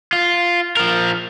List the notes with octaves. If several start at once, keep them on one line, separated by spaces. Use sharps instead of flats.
F4
F3 A#4